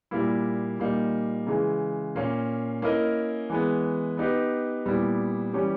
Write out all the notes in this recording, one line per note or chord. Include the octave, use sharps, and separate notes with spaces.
A#2 G3 A#3 E4
A#2 G3 A#3 D#4
C#3 E3 G#3
A#2 A#3 C#4
A#3 C#4 E4 A#4 D#5
E3 G#3 B3
B3 D#4 G4 B4
A#2 G3 B3 E4
E3 G3 C#4 G4